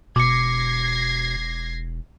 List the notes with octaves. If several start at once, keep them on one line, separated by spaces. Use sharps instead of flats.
E1 B2 D6 G#6 A#6 C7 C#7